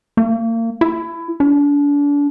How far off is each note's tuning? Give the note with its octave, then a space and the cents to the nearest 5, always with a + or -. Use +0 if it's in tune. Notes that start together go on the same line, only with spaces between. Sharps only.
A#3 -35
E4 +20
D4 -35